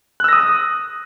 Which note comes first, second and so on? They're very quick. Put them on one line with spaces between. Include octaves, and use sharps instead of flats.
F#6 E6 A#6 D#6